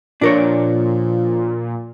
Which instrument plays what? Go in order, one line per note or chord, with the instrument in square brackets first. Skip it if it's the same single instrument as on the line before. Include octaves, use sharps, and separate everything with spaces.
[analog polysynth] A#2 [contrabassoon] F3 [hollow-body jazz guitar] D4 A#4 C#5